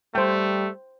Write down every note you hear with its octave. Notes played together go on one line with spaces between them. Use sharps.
G3 A3 C5 G5